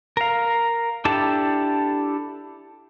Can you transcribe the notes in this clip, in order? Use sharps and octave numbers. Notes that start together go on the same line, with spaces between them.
A#4 F5
D4 E4 G4 A4 A5